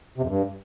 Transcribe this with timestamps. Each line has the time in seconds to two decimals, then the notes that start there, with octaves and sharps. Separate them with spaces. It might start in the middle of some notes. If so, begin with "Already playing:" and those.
0.18 C3
0.23 F2
0.28 G2